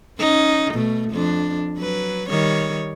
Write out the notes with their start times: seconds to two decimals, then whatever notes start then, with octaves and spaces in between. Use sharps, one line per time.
0.19 C#4 D#4
0.73 B2 A3
1.11 F2 D4
1.77 F#3 B4
2.29 D#3 G3 C#5